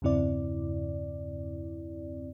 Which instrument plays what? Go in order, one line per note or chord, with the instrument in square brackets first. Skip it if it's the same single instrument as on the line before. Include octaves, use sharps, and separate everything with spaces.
[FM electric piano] E2 G2 C#3 C4 E4 D5